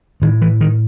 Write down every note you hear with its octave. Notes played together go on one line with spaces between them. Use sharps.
A2 D#3
E3
D#3